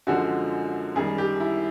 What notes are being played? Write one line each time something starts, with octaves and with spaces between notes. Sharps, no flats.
F#2 D3 F3 G#3 F#4
F#2 D#3 G3 G#4
G4
E4